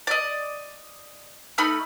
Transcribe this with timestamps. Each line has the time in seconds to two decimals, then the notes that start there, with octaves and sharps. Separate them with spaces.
0.07 D5 D#5
1.58 A3 D#4 B5 F6